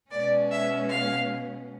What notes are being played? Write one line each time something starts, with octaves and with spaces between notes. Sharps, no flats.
B2 G#3 C#4 D5
E5
F5